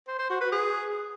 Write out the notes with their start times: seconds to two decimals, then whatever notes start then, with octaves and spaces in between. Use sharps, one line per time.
0.08 C5
0.19 C5
0.30 F#4
0.41 B4
0.52 G#4